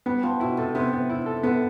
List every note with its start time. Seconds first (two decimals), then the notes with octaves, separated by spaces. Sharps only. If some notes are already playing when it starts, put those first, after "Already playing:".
0.06 G3 B3
0.23 F3 B3
0.40 B2 E4
0.57 C3 A4
0.75 C3 B3
0.93 B3
1.09 E4
1.26 A4
1.43 D3 B3